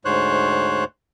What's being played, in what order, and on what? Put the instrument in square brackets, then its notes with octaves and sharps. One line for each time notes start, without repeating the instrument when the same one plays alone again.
[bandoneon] D2 G#2 C5 C#5 F#6